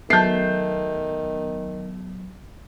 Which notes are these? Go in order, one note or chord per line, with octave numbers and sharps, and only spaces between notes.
D#3 F#3 A3 B3 G6 C7